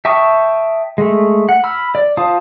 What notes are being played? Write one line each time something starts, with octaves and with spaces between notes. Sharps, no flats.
E5 G5 A5 C#6 D#6
G#3 A3
F#5
B5 E6 F6
D5
F4 C5 F5 A5 D#6